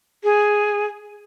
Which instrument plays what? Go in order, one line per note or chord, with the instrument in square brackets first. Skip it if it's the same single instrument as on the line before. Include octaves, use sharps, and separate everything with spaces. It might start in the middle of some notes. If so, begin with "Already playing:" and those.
[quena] G#4